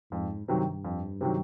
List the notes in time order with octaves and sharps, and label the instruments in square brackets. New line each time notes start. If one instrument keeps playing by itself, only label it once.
[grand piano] F2 [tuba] G#2
[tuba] G2 [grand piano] C3 D#3 F#3
[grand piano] F2
C3 D#3 F#3